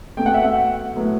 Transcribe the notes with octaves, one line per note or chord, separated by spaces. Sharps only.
B2 A3 G5
F#5
E5
F#5
A2 F#3 B3